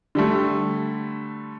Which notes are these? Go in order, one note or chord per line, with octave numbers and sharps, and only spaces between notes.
D3 G3 A3